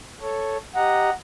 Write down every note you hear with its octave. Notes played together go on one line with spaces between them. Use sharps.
A4 C#5
G4 D#5 F#5 A#5